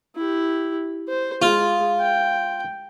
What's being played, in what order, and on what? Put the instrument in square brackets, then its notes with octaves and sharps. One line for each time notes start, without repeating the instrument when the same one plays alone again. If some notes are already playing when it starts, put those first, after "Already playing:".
[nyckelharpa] E4 G4
C5
[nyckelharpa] G#3 [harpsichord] F4
[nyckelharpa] G5